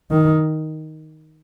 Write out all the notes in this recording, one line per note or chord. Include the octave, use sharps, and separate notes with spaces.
D#3